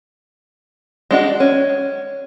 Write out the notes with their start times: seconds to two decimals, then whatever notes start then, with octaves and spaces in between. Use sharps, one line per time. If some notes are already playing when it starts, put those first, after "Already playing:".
1.11 G#3 D4 F#4
1.40 C#4